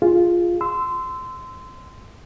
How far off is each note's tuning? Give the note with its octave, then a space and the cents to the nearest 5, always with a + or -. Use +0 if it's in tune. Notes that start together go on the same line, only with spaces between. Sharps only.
F4 +0 G#4 -5
C6 -20 E6 +0